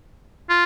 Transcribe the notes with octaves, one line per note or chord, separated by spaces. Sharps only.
F4